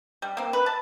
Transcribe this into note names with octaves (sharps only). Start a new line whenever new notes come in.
G3
A#3 C4
B4
A5